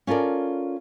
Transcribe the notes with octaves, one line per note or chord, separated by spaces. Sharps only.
C#4 F4 A4 A#4 D5